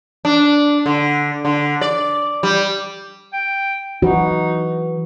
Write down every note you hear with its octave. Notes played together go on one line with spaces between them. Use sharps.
D4
D3
D3
D5
G3
G5
E3 D#4 F#4